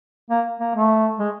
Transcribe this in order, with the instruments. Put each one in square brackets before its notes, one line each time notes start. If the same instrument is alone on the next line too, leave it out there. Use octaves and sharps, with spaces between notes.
[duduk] A#3
A#3
A3
G#3